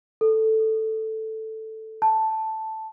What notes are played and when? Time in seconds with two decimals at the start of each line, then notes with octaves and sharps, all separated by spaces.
0.21 A4
2.02 A5